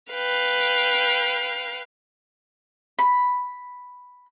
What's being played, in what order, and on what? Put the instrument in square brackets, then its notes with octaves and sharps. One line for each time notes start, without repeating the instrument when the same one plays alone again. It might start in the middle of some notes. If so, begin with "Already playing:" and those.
[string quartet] B4 F5 G5
[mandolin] B5